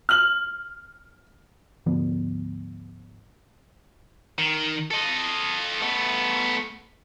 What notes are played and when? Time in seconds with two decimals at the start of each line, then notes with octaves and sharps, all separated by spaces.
0.09 F6 F#7
1.86 D2 G#2 F3 B3
4.38 D#3
4.91 A4 D#5
5.81 A3 B3